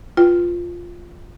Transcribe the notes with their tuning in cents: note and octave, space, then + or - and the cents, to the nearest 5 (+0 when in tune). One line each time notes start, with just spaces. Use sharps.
F4 +0 B4 -10 G5 +0